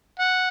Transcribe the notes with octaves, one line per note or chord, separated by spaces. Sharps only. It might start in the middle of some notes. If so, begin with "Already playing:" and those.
F#5